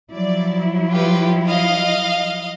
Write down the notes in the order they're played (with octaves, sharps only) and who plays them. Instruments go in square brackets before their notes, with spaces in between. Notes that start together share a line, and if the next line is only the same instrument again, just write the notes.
[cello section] F3 F#3 E4 [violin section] D5
[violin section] F4 G4 B4
D#5 F5